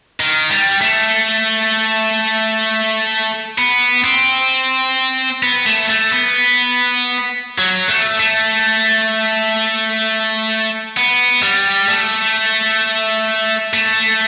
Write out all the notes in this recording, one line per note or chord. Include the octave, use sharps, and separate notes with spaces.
D#3
G3
A3
B3
C4
B3
A3
A3
B3
F#3
A3
A3
B3
G3
A3
A3